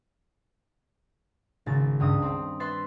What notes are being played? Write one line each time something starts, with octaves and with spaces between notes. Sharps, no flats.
G#1 C#3 A6
C#2 G2 D#6
C4
B4 E5 C6 A6